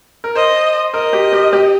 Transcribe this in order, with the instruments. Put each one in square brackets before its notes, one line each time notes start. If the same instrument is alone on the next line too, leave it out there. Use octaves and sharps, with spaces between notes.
[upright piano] A#4
[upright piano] C5 [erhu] D#5
[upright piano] A#4 [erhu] D#5
[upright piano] G4
G4
G4